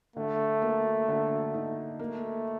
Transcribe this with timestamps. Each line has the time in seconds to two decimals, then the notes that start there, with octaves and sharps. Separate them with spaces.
0.16 D3 A3
0.62 A#3
1.09 D3
1.54 D#4
1.99 A3 A#3